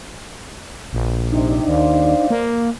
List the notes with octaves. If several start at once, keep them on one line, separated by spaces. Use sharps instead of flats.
A#1
C3 D4 D#4
D#2 C5 D5 F5
A#3